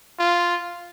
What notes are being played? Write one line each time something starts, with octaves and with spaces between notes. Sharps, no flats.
F4